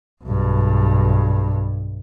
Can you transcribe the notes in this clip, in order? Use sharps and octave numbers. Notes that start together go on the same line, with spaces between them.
B1 G2